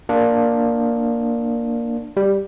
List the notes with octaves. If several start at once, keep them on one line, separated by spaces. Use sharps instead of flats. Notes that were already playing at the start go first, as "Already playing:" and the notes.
A#3 D4
G3